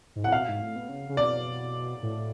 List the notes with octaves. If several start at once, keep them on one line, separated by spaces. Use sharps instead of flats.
G#2
A2 F#5
B2 F5
G#2
A2
B2
C#3
C#3
B2 D5
A2